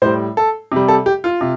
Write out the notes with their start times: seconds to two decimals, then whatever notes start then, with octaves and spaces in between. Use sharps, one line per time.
0.02 A2 G3 C5
0.37 A4
0.72 C3 G3
0.88 A4
1.06 G4
1.24 F4
1.41 C3